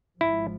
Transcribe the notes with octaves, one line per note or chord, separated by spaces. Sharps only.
G#1 G#2 F3 E4